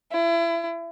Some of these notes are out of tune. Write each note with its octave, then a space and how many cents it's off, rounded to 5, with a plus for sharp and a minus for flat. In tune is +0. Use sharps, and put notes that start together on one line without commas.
E4 +30